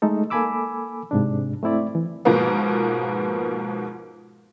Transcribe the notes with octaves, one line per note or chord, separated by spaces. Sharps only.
G#3 A3 D#4 A4
A#3 A4 G#5 B5 D6 E6
G#2 C3 D4
A3 C4 E4 D5
E3
G#2 B2 F3 G#3 A#3 B3